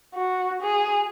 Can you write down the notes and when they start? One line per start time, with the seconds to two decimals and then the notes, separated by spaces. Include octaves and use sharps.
0.14 F#4
0.62 G#4